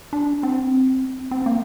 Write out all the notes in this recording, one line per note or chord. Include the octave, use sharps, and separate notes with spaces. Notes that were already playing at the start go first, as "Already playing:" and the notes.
D4
C4
C4
A#3